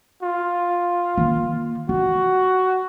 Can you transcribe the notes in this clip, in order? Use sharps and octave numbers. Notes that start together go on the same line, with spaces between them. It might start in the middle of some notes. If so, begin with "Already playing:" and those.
F4
D#3 A#3
F4 F#4